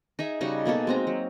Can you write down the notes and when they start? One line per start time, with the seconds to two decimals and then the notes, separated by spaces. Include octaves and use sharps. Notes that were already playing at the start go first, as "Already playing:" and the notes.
0.19 D#4 G#4 E5
0.41 C#3 G3 D#4 F#4
0.66 B2 A#3 G#4 A4
0.87 G#3 C4 A#5
1.07 F#3